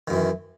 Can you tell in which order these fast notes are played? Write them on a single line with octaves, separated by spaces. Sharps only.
D#3 F#2 E3